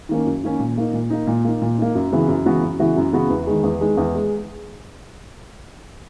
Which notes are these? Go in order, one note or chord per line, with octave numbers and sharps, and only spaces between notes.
D#3 A#3 C#4
F#2
D#3 A#3 C#4
A#2
A#3 D#4
A#2
A#3 D#4
A#2
A#3 D#4
A#2
A#3 D#4
F#2
C#3 E3 B3 F#4
F#2
C#3 E3 B3 F#4
F#2
C#3 E3 B3 F#4
F#2
C#3 E3 B3 F#4
E2
D#3 G#3
E2
D#3 G#3
E2
G#3